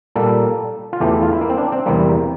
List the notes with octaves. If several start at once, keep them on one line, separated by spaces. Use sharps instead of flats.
A#2 G3 A#3 A4
F4
E2 E3 A3 G4
F4
E4
A#3
C4
D4
C4
E2 C3 G3 A#3